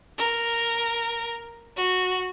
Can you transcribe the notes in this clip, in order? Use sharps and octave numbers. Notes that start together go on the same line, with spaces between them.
A#4
F#4